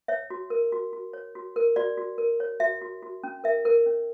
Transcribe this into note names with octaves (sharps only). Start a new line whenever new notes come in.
C#5 E5
F#4
A#4
F#4
F#4
C#5
F#4
A#4
F#4 D5
F#4
A#4
C#5
F#4 E5
F#4
F#4
C#4
A#4 E5
A#4
C#4